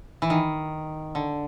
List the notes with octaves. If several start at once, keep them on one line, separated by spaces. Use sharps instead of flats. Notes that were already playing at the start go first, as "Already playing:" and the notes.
E3
D#3
D3